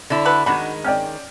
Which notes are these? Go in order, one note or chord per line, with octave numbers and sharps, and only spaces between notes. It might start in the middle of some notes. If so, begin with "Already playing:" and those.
D3 E4
F#4 A4 B4
D#3 G#3 D4 D#4 F#4 B5
C#4 D5 G5 F6